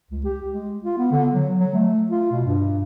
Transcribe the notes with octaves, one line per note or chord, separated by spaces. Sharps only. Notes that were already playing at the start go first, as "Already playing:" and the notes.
C#2
G4
G#3
F4
B3
D3
F#3
F#3
A3
F4
B2
G2